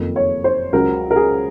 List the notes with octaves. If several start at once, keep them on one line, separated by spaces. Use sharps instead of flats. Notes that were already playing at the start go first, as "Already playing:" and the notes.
Already playing: F#1 F2 D#3 A#3
C#5
C5
C#2 C#3 F#3 C#4 A#4
A#4
G#4